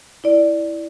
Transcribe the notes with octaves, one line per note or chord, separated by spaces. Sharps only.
E4 D5